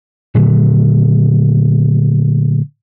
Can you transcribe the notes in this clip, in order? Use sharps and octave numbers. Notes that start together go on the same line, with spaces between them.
A#2 D3 F#3 A3